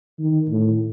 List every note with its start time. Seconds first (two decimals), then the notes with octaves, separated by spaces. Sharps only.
0.20 D#3
0.50 A2